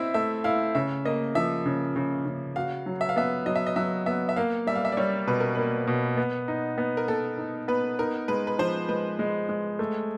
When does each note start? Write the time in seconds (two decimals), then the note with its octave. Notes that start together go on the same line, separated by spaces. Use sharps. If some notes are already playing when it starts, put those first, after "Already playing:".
Already playing: C4 E4 D#5 E5
0.14 A3 E5
0.44 E4 F5
0.75 C#3 E5
1.05 A#3 D#5
1.35 F3 E5
1.66 C#3
1.96 C#3
2.26 C#3
2.56 F#4 F5
2.86 F#3
3.01 E5
3.09 F5
3.16 B3 E5
3.46 F#3 D#5
3.56 E5
3.67 D#5
3.76 F#3 E5
4.06 B3 E5
4.29 E5
4.36 A#3 F5
4.67 G3 E5
4.75 F5
4.85 E5
4.92 D5
4.97 G3 C#5
5.27 B2 B4
5.40 A#4
5.55 A#3 B4
5.87 B2
6.17 B3
6.48 D#4
6.78 B3
6.97 A#4
7.08 B3 A4
7.38 D#4
7.68 B3 B4
7.99 D#4 A#4
8.28 G#3 B4
8.47 B4
8.59 F3 C5
8.89 G#3 B4
9.19 G#3
9.49 G#3
9.79 A3